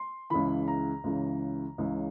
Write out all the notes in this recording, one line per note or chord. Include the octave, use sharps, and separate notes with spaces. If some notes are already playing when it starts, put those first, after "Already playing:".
Already playing: C6
C#2 C#3 E3 B5
A#5
C#2 C#3 E3
C#2 C#3 E3